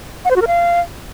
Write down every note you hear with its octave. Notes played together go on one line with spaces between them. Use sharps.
F#5
C5
F#4
A#4
F5